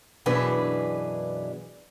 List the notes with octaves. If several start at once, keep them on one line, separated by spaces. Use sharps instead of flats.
F#2 B2 E3 D4 G#4 B4